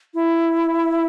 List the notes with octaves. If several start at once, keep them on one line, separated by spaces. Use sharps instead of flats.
E4